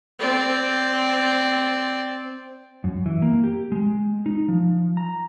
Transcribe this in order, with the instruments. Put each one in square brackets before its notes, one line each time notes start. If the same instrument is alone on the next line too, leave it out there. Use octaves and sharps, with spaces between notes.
[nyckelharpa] C4 D5
[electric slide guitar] F#2
E3
A#3
G4
G#3
D#4
F3
A#5